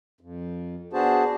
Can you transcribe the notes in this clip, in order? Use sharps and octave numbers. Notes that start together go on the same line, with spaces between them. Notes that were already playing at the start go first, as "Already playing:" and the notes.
F2
B3 D4 F#4 G#4 C5 A5